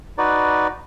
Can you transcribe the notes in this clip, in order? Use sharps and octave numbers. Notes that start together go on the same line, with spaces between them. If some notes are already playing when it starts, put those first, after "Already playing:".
D#4 F#4 B4 D5